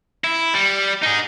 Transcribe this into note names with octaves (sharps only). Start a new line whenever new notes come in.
E4
G3
D#4 G#4